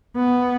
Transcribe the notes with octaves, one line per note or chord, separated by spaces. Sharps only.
B3